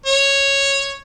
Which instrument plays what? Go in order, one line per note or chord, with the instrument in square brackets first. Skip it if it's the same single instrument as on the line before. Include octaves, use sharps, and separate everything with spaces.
[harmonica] C#5